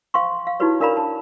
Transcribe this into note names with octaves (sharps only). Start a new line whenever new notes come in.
C5 F5 G5 C6 C#6
F5
D#4 E4 F#4 G4 B4 C#5
D4 A#4 D5 F5 A#5 B5
A5